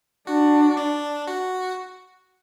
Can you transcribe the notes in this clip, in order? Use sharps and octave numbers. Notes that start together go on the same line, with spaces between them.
D4 F#4
D4
F#4